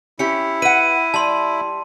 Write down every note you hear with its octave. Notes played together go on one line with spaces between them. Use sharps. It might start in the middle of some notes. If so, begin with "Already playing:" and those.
C#4 E4 G4 C#7
B4 F#5 D#7
G3 A5 C6